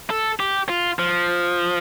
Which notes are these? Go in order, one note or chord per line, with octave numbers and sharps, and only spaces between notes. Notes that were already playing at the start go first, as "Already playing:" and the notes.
A4
G4
F4
F3